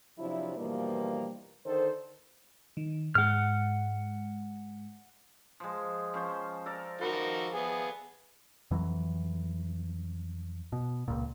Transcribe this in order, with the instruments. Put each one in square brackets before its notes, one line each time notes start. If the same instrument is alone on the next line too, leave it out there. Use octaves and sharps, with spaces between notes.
[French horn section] C3 F3 F#3 D4 E4
G2 B2 E3 F3 G3 A#3
D3 D#3 D#4 A4 C5
[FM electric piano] D#3
[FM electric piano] G#2 G#3 [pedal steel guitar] F#5 F6
[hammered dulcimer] F3 G#3
F3 C#4 C5
A4 A#4 D5
[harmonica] D#3 F#4 A#4 [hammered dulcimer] F3 B4
[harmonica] B3 G#4
[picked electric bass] F2 E3 F#3
B2
C#2 A#2